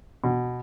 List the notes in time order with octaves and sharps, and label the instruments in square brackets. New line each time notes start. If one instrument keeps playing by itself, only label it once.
[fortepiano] B2